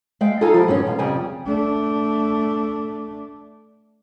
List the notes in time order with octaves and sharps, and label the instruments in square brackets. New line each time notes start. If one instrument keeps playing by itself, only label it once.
[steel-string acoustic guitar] G#3 E5 F5 G5
D#4 F4 A4 F5 G#5 A#5
F3 E4 G4
G2 D3 D#3 G#3 C#4
B2 B3 F5
F2 C#3 G3 G5 G#5 A#5
[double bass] A3 D4